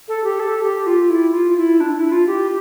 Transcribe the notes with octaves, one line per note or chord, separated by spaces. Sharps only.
A4
G4
A4
G4
F4
E4
F4
E4
D4
E4
F4
G4